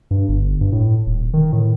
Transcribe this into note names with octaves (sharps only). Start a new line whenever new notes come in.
G2
G1
G2
A2
D#1
D#3
A2